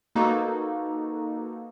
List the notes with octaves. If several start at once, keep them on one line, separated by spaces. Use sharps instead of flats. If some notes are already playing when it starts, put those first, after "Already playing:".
A#3 D#4 F#4 A4 B4